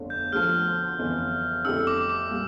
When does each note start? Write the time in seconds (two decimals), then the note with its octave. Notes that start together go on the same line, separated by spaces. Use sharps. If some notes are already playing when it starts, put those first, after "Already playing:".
Already playing: G1 F2 D3 A3 D4
0.10 G6
0.32 D2 D3 F3 F6
0.99 G1 F2 E3
1.65 F2 D3 A3 E4 G4 E6
1.87 D6
2.10 D6
2.31 A#2 G3